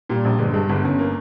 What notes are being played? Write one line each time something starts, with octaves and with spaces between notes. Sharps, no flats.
A#2 G3
A#1
G1 G#3
G2 G#3
G1 B3
G1 C#4
A#3